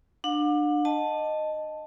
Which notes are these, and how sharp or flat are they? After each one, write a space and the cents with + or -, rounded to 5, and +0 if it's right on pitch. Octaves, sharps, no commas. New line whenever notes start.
D4 +25 F#5 -45
D#5 -10 A5 +0